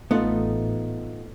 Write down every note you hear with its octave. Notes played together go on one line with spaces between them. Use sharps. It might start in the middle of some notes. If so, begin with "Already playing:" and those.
A1 A3 B3 D#4 F4